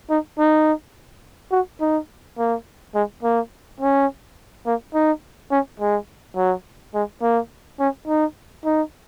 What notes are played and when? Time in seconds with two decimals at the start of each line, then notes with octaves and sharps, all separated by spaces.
0.10 D#4
0.38 D#4
1.52 F#4
1.81 D#4
2.38 A#3
2.95 G#3
3.23 A#3
3.81 C#4
4.66 A#3
4.94 D#4
5.51 C#4
5.80 G#3
6.36 F#3
6.94 G#3
7.22 A#3
7.80 C#4
8.08 D#4
8.65 D#4